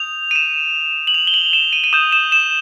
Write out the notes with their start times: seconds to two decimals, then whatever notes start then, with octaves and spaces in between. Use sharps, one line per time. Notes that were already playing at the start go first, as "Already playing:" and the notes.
Already playing: D#6 G6 F7
0.31 D#7
0.36 E7
1.07 F#7
1.14 F7
1.27 G7
1.34 F#7
1.53 E7
1.73 D#7
1.84 D#7
1.93 D#6 G6 E7
2.12 E7
2.32 E7